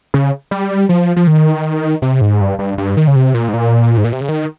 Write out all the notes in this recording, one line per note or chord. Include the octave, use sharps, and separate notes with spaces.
C#3
G3
F3
F3
D#3
C3
G#2
G2
G2
G2
D#3
C#3
C3
A#2
G#2
A#2
G#2
A#2
C3
C#3
D#3